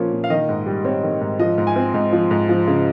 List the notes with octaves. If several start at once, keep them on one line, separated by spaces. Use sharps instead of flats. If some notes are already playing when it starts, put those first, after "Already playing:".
Already playing: A#2 F3 A#3 C#4
A#2
F5
D#3 D#5
G#2
G3
C4 C#5
D#3
G#2
F3 D#5
G#2
G#5
C4
G#2
F3
G#2
F3
C#3